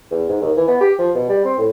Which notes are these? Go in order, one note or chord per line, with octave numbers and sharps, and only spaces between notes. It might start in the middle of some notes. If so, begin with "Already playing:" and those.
E2
G#2
D#2
E3
B3
G4
F3
B2
G3
C4
A2